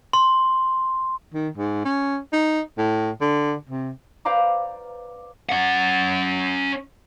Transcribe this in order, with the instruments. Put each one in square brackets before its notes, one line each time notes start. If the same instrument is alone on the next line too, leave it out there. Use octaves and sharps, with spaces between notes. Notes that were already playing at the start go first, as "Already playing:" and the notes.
[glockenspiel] C6
[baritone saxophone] D#3
G#2
C#4
D#4
A2
D3
C3
[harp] B4 C5 D5 F5 A#5 D6
[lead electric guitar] C#4 F#5